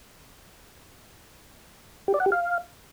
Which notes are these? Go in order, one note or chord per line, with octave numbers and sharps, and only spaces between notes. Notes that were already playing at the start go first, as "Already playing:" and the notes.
G4
D5
F#5
G4
F5